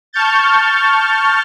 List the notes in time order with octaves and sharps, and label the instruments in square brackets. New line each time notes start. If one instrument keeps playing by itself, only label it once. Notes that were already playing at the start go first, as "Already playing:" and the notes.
[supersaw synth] A5 C#6 F6 G6 A6